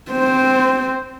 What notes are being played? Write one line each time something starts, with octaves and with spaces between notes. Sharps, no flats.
C4 C5